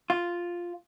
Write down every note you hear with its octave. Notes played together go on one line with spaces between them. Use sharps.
F4